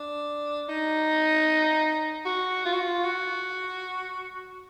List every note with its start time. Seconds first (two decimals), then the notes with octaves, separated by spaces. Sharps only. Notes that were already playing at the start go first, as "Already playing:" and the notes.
Already playing: D4
0.69 D#4
2.25 F#4
2.65 F4
2.73 F#4
2.80 F4
3.04 F#4